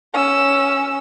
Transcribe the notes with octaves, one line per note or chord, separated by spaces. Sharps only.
C#4 E6